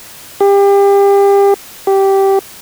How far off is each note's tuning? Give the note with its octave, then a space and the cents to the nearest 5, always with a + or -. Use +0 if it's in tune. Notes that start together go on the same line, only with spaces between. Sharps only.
G4 +30
G4 -10